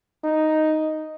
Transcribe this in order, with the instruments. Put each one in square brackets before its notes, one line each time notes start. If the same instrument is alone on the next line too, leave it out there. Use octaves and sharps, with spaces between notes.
[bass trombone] D#4